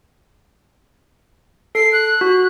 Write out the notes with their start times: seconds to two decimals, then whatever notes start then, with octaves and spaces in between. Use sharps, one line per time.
1.75 A4 C7
1.92 F#6
2.21 F#4